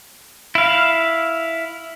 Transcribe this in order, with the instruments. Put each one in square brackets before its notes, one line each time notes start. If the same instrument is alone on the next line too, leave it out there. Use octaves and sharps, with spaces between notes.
[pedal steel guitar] E4 F5